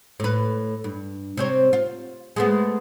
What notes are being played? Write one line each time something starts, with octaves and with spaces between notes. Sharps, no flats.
A2 B4
G2
C3 C4 C#5
F4
G#3 A3 B3